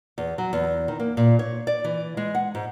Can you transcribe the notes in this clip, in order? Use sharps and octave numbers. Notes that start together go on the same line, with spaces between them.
E2
F#3
E2
D#3
A#3
A#2
C#5
D5
E3
G#3
F#5
G#2